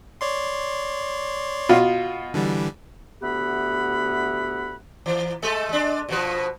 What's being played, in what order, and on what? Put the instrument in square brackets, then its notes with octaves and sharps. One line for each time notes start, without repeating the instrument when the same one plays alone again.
[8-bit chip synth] C#5 D5 C6
[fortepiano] B2 F4
[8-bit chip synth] D3 E3 G3
[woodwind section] D2 B3 G4 E5 F#5 B5
[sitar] E3
G#3 A3 A4
G#3 D4
B2 F3 B4